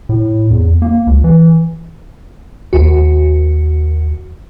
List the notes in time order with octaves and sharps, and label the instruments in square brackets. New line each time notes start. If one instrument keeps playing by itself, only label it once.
[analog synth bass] A2
E2
A#3
C#2
E3
[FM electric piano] D#2 F#4